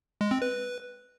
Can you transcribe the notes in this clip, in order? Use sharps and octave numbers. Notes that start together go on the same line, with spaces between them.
G#3
C4
B4